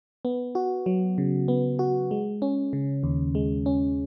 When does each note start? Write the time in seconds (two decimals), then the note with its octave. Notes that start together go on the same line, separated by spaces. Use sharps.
0.25 B3
0.55 F#4
0.86 F#3
1.18 C#3
1.48 B3
1.79 F#4
2.11 G#3
2.42 C#4
2.73 C#3
3.03 D#2
3.35 G#3
3.66 C#4